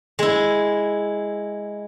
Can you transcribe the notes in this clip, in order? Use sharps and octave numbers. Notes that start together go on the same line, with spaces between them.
G#3 E4